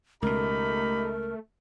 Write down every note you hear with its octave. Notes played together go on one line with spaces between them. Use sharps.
C#2 B2 A3 D#4 G4 A#4 B5